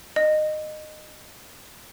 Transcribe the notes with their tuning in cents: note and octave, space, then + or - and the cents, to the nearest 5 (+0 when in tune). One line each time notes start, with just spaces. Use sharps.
D#5 -20